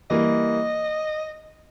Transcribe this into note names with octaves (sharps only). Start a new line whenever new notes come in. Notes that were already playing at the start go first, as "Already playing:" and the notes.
E3 G3 A#3 D#5